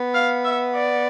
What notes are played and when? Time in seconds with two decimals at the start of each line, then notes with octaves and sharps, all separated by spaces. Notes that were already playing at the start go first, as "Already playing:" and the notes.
Already playing: B3
0.14 F5
0.45 E5
0.75 D5